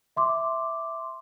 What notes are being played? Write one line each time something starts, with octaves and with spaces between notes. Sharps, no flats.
E5 C6 D6